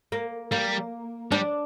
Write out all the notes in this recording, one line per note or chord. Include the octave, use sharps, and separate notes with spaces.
A#3
G3 A#3
G3 D4